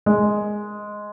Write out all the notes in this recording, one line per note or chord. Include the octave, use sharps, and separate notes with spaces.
G#3